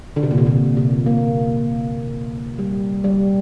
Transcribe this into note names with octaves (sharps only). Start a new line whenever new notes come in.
D3
C3
A#2
C3
A#2
C3
A#3
G3
G3